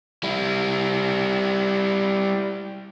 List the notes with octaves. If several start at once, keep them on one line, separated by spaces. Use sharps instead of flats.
G3 E4